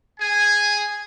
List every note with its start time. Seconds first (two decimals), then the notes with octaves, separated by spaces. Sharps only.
0.19 G#4 G#5